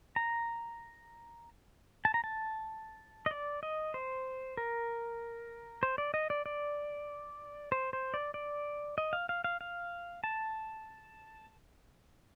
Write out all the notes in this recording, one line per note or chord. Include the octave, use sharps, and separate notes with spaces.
A#5
A5
A#5
A5
D#5
D5
D#5
C5
A#4
C5
D5
D#5
D5
D5
C5
C5
D5
D5
D#5
F5
F5
F5
F5
A5